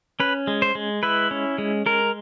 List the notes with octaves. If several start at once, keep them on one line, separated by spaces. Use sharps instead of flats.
C#4 B4
G#3
C5
G#3
E4 B4
C#4
G#3
G#3 A#4